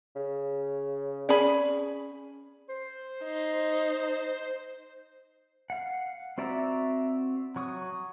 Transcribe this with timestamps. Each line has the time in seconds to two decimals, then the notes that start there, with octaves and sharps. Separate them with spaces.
0.16 C#3
1.29 C#4 G#4 D5 B5
2.69 C5
3.23 D#4
5.70 F5 F#5
6.38 C4 F#4 D5 E5 A#5
7.56 F#3 C#6 D#6